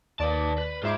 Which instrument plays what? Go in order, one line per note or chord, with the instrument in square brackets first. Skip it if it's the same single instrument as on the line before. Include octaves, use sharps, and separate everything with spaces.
[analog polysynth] D#2 D5 [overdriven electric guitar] B4 A5
[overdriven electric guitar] B4
[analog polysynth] G#2 C5 D6 [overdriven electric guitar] F4 E5